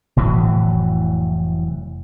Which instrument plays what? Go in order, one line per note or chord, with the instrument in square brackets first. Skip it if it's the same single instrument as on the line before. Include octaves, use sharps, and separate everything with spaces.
[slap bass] F1 A2 E3 F#3